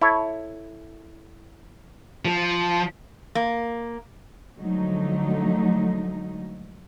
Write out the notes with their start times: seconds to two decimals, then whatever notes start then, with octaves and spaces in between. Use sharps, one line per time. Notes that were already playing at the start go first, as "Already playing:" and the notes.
0.02 E4 A4 C#5
2.25 F3
3.35 A#3
4.57 D3 F3 F#3 G#3 A3 D#4